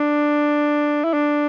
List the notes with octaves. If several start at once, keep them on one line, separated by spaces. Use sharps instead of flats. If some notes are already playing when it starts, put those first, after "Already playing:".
Already playing: D4
E4
D4